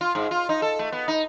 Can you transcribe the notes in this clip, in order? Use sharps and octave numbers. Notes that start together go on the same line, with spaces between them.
F4
G#2
F4
D#4
A4
A3
B3
D#4